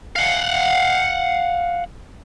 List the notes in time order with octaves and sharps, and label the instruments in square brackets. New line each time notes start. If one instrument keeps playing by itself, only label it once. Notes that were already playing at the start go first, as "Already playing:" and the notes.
[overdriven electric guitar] F5 F#5